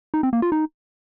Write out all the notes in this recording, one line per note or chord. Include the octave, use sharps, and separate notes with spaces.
D#4
C4
A#3
F4
D#4